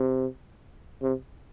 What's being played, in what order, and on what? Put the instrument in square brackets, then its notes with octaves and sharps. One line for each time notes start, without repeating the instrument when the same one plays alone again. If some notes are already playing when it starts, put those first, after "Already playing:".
Already playing: [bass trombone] C3
C3